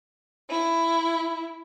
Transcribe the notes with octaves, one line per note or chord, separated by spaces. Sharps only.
E4